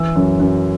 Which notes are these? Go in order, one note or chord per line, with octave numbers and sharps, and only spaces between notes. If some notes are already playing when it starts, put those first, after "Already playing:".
Already playing: E3 E6
F#2
F#2